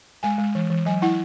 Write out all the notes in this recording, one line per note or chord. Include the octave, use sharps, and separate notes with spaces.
G#3 G#5
G#3
E3
E3
F#3 G#5
E4 F#5